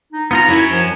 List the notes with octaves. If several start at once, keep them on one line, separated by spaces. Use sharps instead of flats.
D#4
B3 D#4 F4 A#5
F#2 C#4 E4 F#4 A#4 C#5
F3